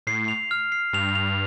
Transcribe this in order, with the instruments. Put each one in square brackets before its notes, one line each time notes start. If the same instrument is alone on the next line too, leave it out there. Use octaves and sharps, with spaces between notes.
[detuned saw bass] A2 [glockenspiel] C7
[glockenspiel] F7
F6
C7
[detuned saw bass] G2 [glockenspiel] F7
[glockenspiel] F7